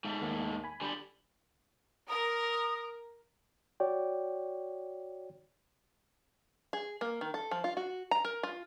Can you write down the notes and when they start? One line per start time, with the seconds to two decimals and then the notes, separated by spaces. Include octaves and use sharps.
0.05 G#2 A3
0.21 D#2 A#3
0.64 G#5 B5
0.81 D3 G3
2.09 A#4 D#6
3.80 F#4 C#5 D5 G5
6.73 G#4
7.01 A#3
7.21 D#3
7.34 A4
7.51 F3
7.64 F4
7.77 F#4
8.11 A#5
8.25 A#4
8.43 F4